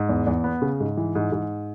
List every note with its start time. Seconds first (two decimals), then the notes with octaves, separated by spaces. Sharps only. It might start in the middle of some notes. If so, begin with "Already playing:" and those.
Already playing: G#2
0.09 E2
0.27 E2
0.44 B3
0.62 C#3
0.80 G#2
0.97 E3
1.15 G#2
1.32 G#2